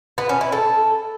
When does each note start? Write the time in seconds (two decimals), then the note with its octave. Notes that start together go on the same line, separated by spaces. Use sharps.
0.18 B3
0.29 C#4
0.41 E4
0.52 A4